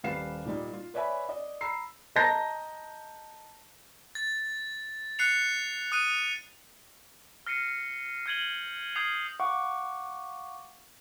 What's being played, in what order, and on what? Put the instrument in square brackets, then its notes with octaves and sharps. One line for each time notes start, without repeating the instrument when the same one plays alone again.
[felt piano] D#1 G3 B4 F5 C7 E7
A#2 G3 D#4
F4
B4 C#5 D5 E5 G#5 B5
D5 D#5
A#5 B5 E6 C7
[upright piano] D#5 A5 A#5 G6 A#6
[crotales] A6
F#6 C7 C#7 F7
D#6 F#6 D#7
F6 A#6 C7 C#7 D#7
F6 G6 G#6 D#7 F#7 G7
D#6 F6 G6 G#6 C7 F7
[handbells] F5 F#5 C#6 D6